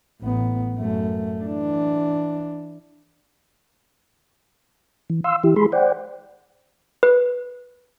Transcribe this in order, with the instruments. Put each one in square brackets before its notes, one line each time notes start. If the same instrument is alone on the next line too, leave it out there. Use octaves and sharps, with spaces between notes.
[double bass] A1 B3
F#2 A3
E3 D4
[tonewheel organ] E3
F5 C6 E6
E3 E4 G4
G#3 G#4 B5 C6
C5 D5 F#5 G5
[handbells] B4